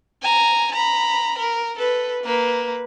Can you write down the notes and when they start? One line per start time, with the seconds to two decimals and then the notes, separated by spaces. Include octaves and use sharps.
0.22 G#5 A#5
0.73 A#5 B5
1.38 A#4
1.79 A4 B4
2.24 A#3 B4